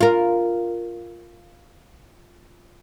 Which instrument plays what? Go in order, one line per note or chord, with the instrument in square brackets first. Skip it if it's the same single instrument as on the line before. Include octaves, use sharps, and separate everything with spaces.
[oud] F4 A#4